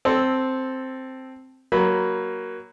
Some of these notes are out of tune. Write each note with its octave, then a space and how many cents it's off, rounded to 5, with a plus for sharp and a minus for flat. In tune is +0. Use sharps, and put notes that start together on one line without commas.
C4 +0 A4 -5
F#3 +15 A#3 +10 B5 +0